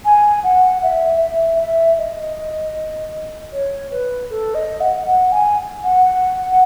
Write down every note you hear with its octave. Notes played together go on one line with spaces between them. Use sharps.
G#5
F#5
E5
E5
E5
D#5
C#5
B4
A4
D#5
F#5
F#5
G#5
F#5